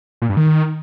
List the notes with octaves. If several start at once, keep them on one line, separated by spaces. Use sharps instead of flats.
A#2
G2
D#3